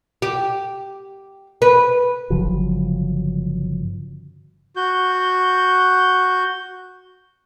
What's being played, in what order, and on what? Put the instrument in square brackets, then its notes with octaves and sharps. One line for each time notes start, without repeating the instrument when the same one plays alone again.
[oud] G4
B4
[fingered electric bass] G1 C#3 F3 F#3
[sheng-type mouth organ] F#4 G6